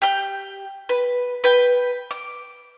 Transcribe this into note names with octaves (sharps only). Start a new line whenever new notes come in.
G4 G6
B4
B4 G5
D6